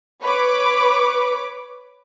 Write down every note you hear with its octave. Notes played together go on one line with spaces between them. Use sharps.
B4 C#5 B5 D6